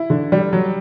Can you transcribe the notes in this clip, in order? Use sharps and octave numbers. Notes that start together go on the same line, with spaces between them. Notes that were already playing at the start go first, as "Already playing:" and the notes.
Already playing: E4
D3
G3
F#3